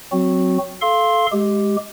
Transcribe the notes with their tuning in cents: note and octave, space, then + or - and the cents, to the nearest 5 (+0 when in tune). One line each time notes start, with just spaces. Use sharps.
F#3 +0 C4 +0 F#4 -10
A4 -15 F5 -15 C6 +15
G#3 +0 G4 +0